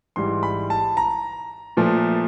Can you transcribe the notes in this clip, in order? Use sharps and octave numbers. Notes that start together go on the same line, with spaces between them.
G#2 E3 G3 C6
B5
A5
A#5
A#2 F3 A3